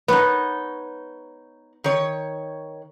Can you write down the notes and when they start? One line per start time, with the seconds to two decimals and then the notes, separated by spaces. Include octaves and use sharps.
0.08 B3 D#4 C#5
1.84 D#3 C#5